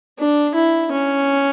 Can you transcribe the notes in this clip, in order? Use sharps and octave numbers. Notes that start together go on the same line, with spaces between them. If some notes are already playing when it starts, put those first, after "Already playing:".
D4
E4
C#4